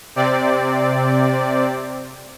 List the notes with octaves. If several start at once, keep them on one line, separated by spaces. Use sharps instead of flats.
C3 C4 D5